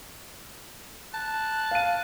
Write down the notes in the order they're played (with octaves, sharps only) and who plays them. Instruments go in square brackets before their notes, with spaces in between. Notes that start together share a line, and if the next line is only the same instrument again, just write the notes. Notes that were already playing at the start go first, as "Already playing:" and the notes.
[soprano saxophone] A5 [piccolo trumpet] F#6
[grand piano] F5 D#7